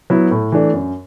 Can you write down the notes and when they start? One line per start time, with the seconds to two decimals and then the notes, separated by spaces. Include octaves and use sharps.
0.10 F#3 B3 E4
0.31 A2
0.52 E3 A3 D4
0.73 F#2